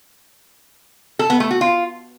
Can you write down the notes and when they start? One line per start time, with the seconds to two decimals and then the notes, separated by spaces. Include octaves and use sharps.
1.19 A4
1.30 B3
1.40 A3
1.51 F#4
1.61 F4